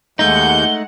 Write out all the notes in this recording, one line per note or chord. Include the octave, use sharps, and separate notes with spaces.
D#2 G#3 A3 D#4 F#5 G6 G7